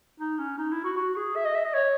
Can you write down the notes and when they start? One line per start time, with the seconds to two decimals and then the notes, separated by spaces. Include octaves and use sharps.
0.20 D#4
0.39 C#4
0.58 D#4
0.72 E4
0.84 F#4
0.96 F#4
1.16 G#4
1.36 E5
1.45 D#5
1.55 E5
1.65 D#5
1.74 C#5